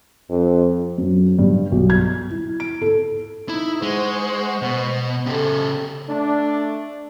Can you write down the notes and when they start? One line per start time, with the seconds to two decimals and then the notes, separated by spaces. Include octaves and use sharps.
0.29 F2
0.98 F#2
1.39 G2
1.72 B1
1.90 G#6
2.30 E4
2.60 D7
2.81 A4
3.49 D#4 E4
3.82 G#3 C5 F#5 C#6
4.63 B2
5.27 C#3 G4 A4
6.09 A3 D4